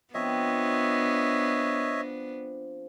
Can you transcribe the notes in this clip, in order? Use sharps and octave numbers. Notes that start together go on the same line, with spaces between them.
F3 B3 C4 D4 C#5 D#5 E5